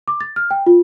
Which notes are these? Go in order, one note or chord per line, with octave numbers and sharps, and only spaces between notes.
D6
A6
F6
G5
F4